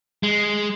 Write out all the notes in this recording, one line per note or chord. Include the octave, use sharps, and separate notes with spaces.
G#3